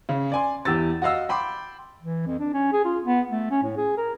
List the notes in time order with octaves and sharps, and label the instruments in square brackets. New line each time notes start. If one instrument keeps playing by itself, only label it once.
[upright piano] C#3
D5 G#5 C6
E2 G4 E6 A6
F#4 D#5 F5 E6
G5 B5 C6 D6
[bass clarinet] E3
F2
D4
C#4
G#4
F4
B3
A3
C#4
A2
G#4
A#4